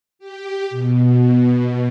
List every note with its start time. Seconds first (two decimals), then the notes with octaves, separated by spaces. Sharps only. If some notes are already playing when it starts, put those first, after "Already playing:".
0.19 G4
0.70 B2